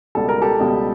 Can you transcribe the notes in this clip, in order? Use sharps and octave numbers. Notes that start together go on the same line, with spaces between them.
C#2 B2 G3 A4
A#4
G4 A4
C#2 B2 G3